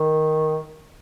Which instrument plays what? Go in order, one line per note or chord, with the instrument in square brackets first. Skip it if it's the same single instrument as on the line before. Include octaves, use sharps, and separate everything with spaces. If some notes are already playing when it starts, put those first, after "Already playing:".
Already playing: [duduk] D#3